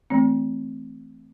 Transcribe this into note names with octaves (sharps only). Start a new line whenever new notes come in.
E3 A3 C4